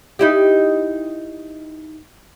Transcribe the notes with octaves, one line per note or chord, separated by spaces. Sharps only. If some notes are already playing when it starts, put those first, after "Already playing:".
D#4 E4 G4